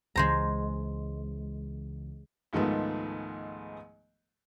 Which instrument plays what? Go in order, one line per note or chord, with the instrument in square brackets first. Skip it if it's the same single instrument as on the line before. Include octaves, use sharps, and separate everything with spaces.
[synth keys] C#2 C#3 E3 [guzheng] G#3 C5 A#5
[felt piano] C#2 G#2 D#3 F3 A3 B3